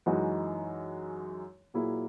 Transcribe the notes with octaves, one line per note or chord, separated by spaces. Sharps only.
F#2 E3 G#3 D#4 F#4
A#2 F#3 A#3 E4 G#4